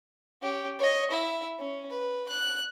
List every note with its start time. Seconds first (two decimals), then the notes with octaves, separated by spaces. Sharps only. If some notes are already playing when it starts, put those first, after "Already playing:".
0.42 C#4 G4
0.79 C#5 D#5
1.11 E4 E5
1.59 C#4
1.90 B4
2.28 F#6